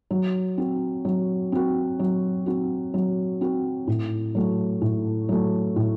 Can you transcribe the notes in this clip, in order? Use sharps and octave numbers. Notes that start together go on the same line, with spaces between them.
F#3
C4 F#4
F#3
C4 F#4
F#3
C4 F#4
F#3
C4 F#4
A2
F#3 A3
A2
F#3 A3
A2